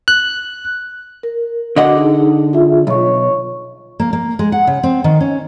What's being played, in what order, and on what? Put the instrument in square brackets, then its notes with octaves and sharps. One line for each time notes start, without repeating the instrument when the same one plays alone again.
[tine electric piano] F#6
[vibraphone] A#4
[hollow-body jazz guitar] D3 D#5 F#5 [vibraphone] F#4 D6
[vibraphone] D#4 G#4
F4 G#4 E5
[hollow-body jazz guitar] B1 [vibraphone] C#5 C#6
[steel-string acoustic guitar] A#3
A#3
G#3
F#5
C#3
C4
D#3
C#4